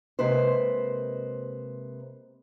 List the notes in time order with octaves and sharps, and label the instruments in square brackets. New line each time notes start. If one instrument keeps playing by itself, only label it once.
[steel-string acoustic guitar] C3 G#3 A#3 B4 C5